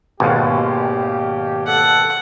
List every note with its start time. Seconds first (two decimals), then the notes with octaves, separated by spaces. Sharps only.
0.20 G#1 D#2 B2 G4 F5
1.67 A4 F#5